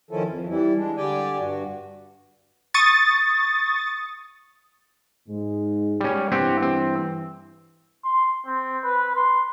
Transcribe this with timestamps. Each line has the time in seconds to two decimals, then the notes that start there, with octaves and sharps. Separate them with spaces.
0.11 D#3 F3 C#4 E4 A4
0.28 F2
0.49 E3 G3 E4
0.76 G#3 D4
0.97 D3 G3 G4 D5 G5 G#5
1.39 G2 F#4
2.74 C#6 D#6 A6
5.28 G#2 G#3
6.01 G3 C#4
6.32 G2 E3 C4 G4 F#5
6.62 C4
8.04 C6
8.46 C4
8.84 B4
9.16 C6